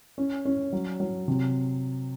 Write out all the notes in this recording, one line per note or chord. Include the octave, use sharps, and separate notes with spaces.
C#4
C#4
F#3
F#3
C3